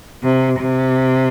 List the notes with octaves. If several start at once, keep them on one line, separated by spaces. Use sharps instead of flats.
C3
C3